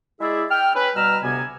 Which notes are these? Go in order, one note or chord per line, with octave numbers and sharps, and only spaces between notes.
G#3 E4 G#4 D5 E5
G5 F6
C#4 B4
B2 G3 A#5 E6 F6
D2 C3 B3 G#5